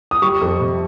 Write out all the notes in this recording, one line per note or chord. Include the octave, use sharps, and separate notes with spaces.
D#6
G3 C#6
F2
C3